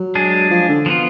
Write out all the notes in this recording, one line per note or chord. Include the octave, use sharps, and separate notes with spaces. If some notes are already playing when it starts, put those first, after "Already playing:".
Already playing: F#3
G#3 D4 G#4
F3
D3
F3 B3 F4